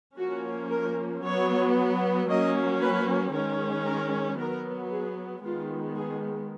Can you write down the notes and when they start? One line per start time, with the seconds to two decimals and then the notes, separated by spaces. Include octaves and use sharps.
0.18 F3 A#3 C#4 F#4
0.70 A#4
1.23 F#3 B3 C#5
2.28 F#3 A#3 C#4 D#5
2.81 B4
3.33 D#3 G#3 C#4 A#4
3.85 A#4
4.38 F#3 B3 A#4
4.91 G#4
5.43 D#3 G#3 B3 F4
5.96 G#4